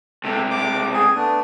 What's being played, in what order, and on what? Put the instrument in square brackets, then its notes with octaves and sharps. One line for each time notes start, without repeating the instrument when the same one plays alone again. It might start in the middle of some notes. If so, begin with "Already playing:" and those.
[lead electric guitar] C#2 C3 [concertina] A4
[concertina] D6
G#4 G#5
A3 B3 D4